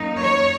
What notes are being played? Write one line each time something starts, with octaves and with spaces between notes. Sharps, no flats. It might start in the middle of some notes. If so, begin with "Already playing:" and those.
Already playing: F#2 A#3 D#4
C#5